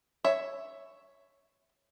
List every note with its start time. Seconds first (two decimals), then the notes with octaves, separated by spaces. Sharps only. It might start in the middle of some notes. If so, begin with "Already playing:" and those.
0.24 C#5 E5